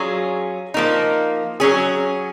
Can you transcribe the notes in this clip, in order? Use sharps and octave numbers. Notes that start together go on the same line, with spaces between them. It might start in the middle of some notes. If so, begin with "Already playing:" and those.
Already playing: F#3 C#4 F4 G#4
F3 A#3 D#4
F#3 C#4 G#4